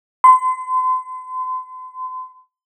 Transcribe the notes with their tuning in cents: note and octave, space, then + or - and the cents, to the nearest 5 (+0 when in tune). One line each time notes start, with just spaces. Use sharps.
C6 -40